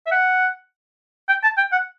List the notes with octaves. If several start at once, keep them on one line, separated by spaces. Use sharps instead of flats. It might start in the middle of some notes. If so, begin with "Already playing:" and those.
E5
F#5
G5
A5
G5
F#5